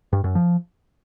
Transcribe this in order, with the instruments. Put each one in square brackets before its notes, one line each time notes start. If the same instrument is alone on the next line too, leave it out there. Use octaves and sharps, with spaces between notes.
[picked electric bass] G2
F#2
F3